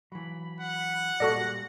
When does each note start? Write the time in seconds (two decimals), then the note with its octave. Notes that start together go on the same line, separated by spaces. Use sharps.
0.12 E3 F#3 B5
0.60 F#5
1.20 A#2 G3 G#3 F#4 A4 D5 A#6